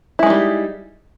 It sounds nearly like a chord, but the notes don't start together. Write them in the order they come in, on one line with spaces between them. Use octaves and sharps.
E4 G#3 D#4 G3